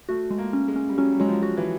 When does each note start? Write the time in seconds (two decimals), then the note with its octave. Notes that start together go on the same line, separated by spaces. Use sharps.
0.09 A3 F#4
0.31 G#3
0.38 A#3
0.53 C#4
0.68 G#3
0.76 C#4
0.89 G3
0.98 F#3 C#4
1.12 G3
1.20 F#3 G#3
1.28 F3
1.43 F#4
1.57 E3